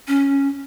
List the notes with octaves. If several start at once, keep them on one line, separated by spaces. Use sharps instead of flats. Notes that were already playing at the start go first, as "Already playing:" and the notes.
C#4